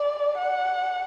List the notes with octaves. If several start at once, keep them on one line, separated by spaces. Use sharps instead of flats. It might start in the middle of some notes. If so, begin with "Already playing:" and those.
Already playing: D5
F#5